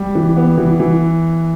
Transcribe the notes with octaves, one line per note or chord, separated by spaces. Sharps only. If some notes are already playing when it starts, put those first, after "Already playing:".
Already playing: G3
E3
B3
E3
E3